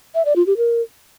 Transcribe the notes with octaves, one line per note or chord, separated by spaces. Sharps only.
E5
D5
F4
G4
A#4